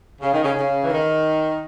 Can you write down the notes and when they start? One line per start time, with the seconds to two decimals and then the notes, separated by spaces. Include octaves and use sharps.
0.22 C#3
0.34 D#3
0.44 C#3
0.55 C#3
0.84 E3
0.90 D#3